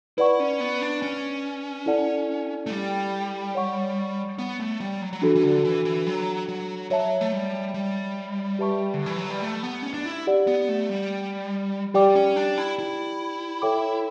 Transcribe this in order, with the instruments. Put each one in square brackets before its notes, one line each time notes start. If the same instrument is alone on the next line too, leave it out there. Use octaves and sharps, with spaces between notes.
[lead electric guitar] E4 [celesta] B4 D5 F#5 C#6
[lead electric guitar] C#4
B3
D4
C#4
[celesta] E4 A4 D5 F#5 A5
[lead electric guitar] A3
G3
[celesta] C#5 F#5 C#6
[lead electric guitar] B3
A3
G3
F#3
F#3
[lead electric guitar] E3 [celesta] D4 F#4 A4
[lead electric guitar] E3
D3
E3
E3
F#3
F#3
[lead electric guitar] F#3 [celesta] C#5 E5 A5
[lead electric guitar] A3
G3
G3
[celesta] G4 B4 E5 A5 C#6
[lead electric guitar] D3
E3
F#3
G3
A3
B3
C#4
D4
E4
[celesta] G4 D5 F#5
[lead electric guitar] B3
A3
G3
[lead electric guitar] G3 [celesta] G4 D5 G5 D6
[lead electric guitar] C#4
D4
E4
E4
[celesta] A4 C#5 E5 G5 D6